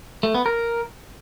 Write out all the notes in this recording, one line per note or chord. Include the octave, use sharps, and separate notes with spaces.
A3
B3
A#4